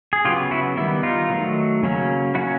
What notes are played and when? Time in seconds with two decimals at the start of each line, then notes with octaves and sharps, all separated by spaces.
0.13 G#4
0.25 C#3 F#3 B3 F4 G4
0.51 E4 F#4
0.77 D#3 G3 B3 E4
1.03 D#4 F4
1.30 D#3 F#3 A3
1.83 C#3 F#3 A#3 C#4
2.34 F#3 A#3 C#4 E4 F#4